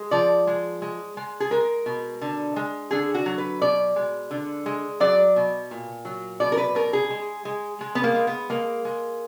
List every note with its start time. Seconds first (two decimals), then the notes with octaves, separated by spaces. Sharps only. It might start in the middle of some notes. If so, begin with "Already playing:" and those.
Already playing: G#3
0.11 F3 D5
0.47 G#3
0.82 G#3
1.17 G#3
1.40 G#4
1.51 G#3 A#4
1.86 B2
2.21 D3
2.56 G#3
2.91 D3 G#4
3.14 F#4
3.26 F#3
3.38 B4
3.61 B2 D5
3.96 G#3
4.31 D3
4.66 G#3
5.00 F#3 D5
5.36 B2
5.71 A#2
6.05 F#3
6.40 B2 D5
6.52 A#4
6.57 B4
6.75 B2 A#4
6.93 G#4
7.10 G#3
7.45 G#3
7.81 G#3
7.95 B3
8.04 A#3
8.15 G#3
8.27 B3
8.50 G#3 A#3
8.85 G#3